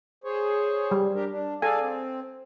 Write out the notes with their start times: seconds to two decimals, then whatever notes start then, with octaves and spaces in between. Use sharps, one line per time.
0.24 G#4 C5 C#5
0.91 G3
1.14 D4 G4 A#4
1.30 D4
1.62 G#4 A4 D5 F5 G#5
1.80 C4